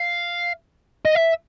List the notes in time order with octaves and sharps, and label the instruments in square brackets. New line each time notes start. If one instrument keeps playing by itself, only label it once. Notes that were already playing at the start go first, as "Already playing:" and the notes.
Already playing: [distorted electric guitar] F5
D#5
E5